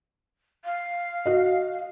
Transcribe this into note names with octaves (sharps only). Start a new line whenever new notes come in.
F5
F#4 D#5